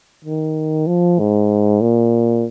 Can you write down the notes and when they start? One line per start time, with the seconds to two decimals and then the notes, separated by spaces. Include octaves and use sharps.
0.25 D#3
0.87 F3
1.19 G#2
1.81 A#2